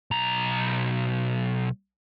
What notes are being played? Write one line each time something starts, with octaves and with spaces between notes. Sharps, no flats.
B1 A#5